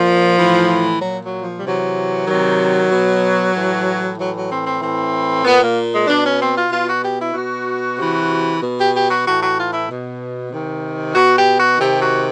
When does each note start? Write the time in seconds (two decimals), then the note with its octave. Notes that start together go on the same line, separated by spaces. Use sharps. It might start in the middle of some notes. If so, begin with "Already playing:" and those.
Already playing: A#2 F3
0.37 A2 E3
1.00 A#2 F#3
1.22 F#3
1.42 F3
1.57 G3
1.63 C3 E3 F#3
2.27 C3 D#3 F#3
2.90 B2
3.54 A2 E3
4.17 A2 E3 F#3
4.33 F#3
4.49 C4
4.65 C4
4.80 A2 E3 C4
5.44 A#2 B3
5.60 A#3
5.92 G#3
6.07 B2 D4
6.23 C#4
6.39 C4
6.55 F4
6.71 B2 F4
6.87 F#4
7.02 G4
7.19 E4
7.34 B2 F#4
7.97 C3 E3
8.61 B2
8.77 G4
8.93 G4
9.09 F#4
9.24 A2 E3 F#4
9.40 F#4
9.56 F4
9.72 E4
9.88 B2
10.51 C3 D#3
11.15 B2 F#4
11.36 G4
11.56 F#4
11.78 C3 D#3 G4
11.99 F#4